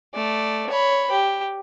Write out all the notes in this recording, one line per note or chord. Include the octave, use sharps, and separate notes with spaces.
A3 D5
C#5 B5
G4